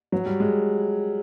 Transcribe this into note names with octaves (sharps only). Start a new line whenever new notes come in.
F#3
G3
G#3